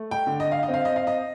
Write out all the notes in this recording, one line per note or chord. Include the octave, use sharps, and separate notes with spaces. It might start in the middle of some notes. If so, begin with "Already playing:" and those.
Already playing: A3
G5
D3
D#5
F5
D#5
C4
F5
D#5
F5
D#5